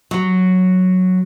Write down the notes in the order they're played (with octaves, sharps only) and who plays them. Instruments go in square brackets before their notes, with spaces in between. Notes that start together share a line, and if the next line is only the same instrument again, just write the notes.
[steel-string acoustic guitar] F#3